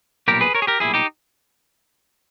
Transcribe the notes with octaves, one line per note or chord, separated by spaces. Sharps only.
B1 A#2 G3 G4 A#4
G#4 B4
A#4 C#5
G#4
G4 A#4
B1 A#2 G3 E4 G#4
D#4 G4